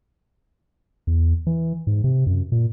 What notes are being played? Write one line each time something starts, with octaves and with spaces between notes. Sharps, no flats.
E2
E3
G#2
C3
F#2
A#2